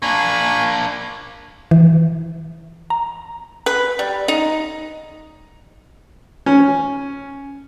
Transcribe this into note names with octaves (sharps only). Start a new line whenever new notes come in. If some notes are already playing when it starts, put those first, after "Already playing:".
A#3 D4 G#5 B5 C#6
E3
A#5
B4
G3
D#4
C#4